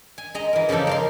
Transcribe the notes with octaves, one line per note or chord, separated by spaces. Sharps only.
G#5
G#3 D#5 A#5
E3 A#4
C#3 F3 A#3 D#4 A4
A#4 F5 C6